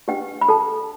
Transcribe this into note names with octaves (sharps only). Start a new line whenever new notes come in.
D4 G4 B4 G5
B5
A4 A5